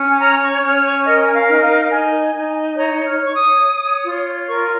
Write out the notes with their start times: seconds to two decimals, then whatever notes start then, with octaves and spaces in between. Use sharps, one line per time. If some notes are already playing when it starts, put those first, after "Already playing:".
Already playing: C#4
0.09 G#5
0.20 C#5 A#5
0.41 C#6
0.62 C#4 F6
0.84 C#6
1.05 A#4 D#5
1.26 G#5
1.33 F5
1.48 D#4
1.62 F5
1.90 D#4 G#5
2.34 D#4
2.77 C#5 A#5
3.05 F6
3.20 C#5
3.26 C#6
3.33 D#6
3.62 C#5
4.05 F4
4.48 A#4 C#6